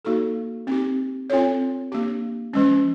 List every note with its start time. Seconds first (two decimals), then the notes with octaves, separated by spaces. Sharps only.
0.05 A#3 D#4 F#4 A4
0.67 C4 D#4 G4
1.30 C4 F4 A4 C#5
1.92 A#3 D4 G4
2.53 F3 G#3 C#4